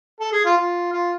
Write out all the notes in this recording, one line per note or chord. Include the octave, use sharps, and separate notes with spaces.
A4
G#4
F4
F4
F4